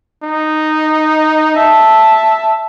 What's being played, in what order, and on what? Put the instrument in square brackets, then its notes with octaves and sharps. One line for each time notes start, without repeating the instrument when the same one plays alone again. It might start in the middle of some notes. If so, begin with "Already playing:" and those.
[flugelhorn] D#4
[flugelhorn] E5 [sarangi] A5